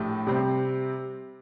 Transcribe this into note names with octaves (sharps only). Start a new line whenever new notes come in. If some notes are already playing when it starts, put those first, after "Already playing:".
Already playing: A#1 A2 A3 G4
C3 G3 C4